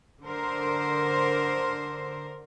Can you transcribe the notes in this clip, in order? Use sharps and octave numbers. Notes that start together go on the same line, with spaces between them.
D3 A#4 C5